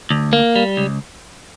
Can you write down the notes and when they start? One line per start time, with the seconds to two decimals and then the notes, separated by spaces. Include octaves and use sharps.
0.10 D2
0.33 A#3
0.56 G3
0.77 C#2